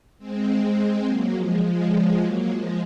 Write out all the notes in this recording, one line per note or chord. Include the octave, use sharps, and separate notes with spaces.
G#3 C4
F#3 A#3
F3 G#3
F3 G#3
F#3 A#3
F3 G#3